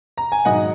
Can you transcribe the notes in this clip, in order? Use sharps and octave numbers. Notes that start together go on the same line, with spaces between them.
A#5
G#5
G#2 D#3 F#3 D#5 F#5